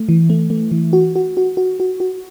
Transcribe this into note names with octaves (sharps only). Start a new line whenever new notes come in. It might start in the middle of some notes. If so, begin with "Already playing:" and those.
Already playing: A3
E3
A3
A3
E3
F#4
F#4
F#4
F#4
F#4
F#4